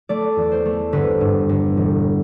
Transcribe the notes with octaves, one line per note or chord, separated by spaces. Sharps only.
A3 D5
E2
C5
A3
G1 B4
G2
G1
E1